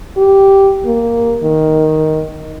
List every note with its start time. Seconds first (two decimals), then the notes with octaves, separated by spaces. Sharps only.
0.17 G4
0.85 A#3
1.43 D#3